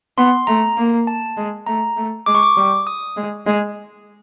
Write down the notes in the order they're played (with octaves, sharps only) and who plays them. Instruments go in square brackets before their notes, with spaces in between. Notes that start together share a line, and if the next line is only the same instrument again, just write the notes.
[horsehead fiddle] B3 [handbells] C6
[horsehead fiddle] A3 [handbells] A#5
[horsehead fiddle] A#3
[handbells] A5
[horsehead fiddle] G#3
[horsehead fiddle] A3 [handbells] A#5
[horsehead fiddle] A3
[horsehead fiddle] G#3 [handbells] D6
[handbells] C#6
D6
[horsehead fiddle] G3
[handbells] D#6
[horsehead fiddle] G#3
G#3